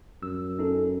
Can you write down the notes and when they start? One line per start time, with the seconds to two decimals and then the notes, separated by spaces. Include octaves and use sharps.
0.23 F#2 E6
0.59 C#4 D#4 A4